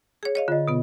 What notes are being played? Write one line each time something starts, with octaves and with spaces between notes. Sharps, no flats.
G#4 C#5
C#5 D#5 F5
D3 F4 D#5
B2 B3